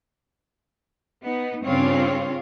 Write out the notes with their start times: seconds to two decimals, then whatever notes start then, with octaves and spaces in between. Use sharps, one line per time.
1.22 B3 D#4
1.64 G2 C#3 C4 D4 F4 C#5